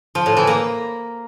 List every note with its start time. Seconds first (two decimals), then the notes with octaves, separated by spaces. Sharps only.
0.15 F3
0.26 A2
0.37 E3
0.47 A#3